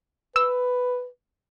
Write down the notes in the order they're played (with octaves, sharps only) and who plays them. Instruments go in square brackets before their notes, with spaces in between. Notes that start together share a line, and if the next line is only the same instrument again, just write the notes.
[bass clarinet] B4 [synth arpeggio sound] E6